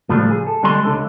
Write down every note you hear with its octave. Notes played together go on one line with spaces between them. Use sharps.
A2 C#3 F3 G3 A3 D4
G#4
A4
D3 G3 G#3 G#5 C6
C#2 D4 A4